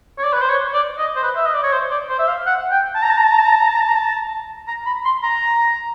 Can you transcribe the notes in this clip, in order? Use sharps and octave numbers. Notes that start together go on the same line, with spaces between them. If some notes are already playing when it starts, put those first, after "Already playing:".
C#5
D5
B4
C5
C#5
D5
D#5
C5
B4
E5
D#5
D5
C#5
C5
D5
C5
E5
F5
F#5
G5
A5
A#5
A5
A#5
A5
A#5
A5
A#5
A5
A#5
A5
A#5
A5
A#5
A5
A#5
B5
C6
A#5